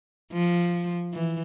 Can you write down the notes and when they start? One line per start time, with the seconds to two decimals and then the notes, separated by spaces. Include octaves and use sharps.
0.33 F3
1.13 E3